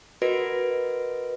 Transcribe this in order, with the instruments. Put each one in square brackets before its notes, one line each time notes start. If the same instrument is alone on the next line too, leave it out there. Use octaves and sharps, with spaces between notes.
[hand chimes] F#4 A#4 B4 D#5 A#6 D7